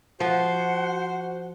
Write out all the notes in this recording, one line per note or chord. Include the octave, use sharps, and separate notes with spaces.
F3 F#4 C5 F#5